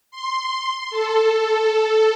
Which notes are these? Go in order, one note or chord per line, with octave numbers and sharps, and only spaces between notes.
C6
A4